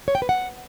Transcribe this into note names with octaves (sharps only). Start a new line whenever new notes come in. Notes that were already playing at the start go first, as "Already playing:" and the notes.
C#5
G5
B4
F#5